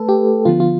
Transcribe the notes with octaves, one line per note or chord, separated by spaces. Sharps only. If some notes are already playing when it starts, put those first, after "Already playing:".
Already playing: A3 A4 B4
G4
D3 F3 B3 F4
F4